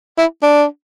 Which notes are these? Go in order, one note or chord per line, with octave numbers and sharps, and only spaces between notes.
E4
D4